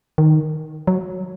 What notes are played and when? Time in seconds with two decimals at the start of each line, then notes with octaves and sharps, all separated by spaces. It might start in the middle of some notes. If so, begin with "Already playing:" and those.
0.18 D#3
0.87 F#3